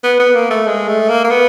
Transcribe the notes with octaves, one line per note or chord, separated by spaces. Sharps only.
B3
B3
A#3
A3
G#3
A3
A#3
A#3
B3